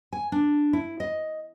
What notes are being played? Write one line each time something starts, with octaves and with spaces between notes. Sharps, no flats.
G#5
D4
E4
D#5